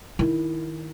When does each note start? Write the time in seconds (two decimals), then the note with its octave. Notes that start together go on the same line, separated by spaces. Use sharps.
0.19 D#3 E4